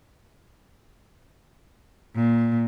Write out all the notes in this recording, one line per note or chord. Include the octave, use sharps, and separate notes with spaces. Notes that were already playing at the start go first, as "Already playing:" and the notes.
A#2